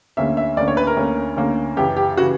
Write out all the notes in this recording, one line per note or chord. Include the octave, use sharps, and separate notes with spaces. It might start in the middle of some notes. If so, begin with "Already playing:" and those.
D2 D3 A#3 C#4 E5
E5
D2 D3 A#3 C#4 D5
C#5
B4
A#4
D2 D3 A#3 C#4
D2 D3 A#3 C#4
F#2 C#3 E3 G4
G4
C#3 E3 F#4